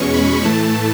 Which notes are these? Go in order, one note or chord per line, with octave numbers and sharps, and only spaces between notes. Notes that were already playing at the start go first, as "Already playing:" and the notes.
Already playing: E2 B2 G#3 C#4 C#6
B5
A2 E3 A3 A5